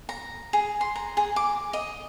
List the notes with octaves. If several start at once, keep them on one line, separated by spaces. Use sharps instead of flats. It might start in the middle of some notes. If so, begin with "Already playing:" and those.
A#5
G#4
C6
A#5
G#4
D6
D#5